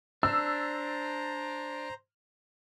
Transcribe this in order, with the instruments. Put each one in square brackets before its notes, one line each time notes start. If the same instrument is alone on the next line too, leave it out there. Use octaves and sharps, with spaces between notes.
[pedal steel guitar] D4 [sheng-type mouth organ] C5 A#5 [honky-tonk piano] E6